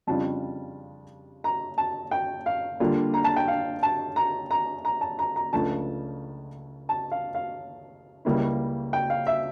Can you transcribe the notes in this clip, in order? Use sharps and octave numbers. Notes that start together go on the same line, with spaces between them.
F2 C#3 G3 D4 F4 A5
A#5
A5
G5
F5
D3 G3 A#3 D4 F4
A#5
A5
G5
F5
A5
A#5
A#5
A#5
A5
A#5
A#5
C#2 C#3 F3 A3 D4 A5
A5
F5
F5
C#2 C#3 G3 A#3 E4
G5
F5
E5